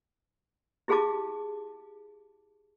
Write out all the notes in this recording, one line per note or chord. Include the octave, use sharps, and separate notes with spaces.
E4 G4 G#4 F5 A5 D6